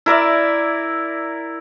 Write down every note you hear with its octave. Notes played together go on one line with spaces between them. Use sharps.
E4 A#4 D5 E5